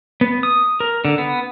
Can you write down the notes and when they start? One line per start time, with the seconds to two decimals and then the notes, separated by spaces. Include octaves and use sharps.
0.21 B3
0.43 D#6
0.80 A#4
1.05 D3
1.18 B3